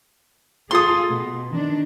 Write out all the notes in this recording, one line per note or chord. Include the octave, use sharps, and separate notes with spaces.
F4 G#4 A4 C6 D#6
B2
D#3 D4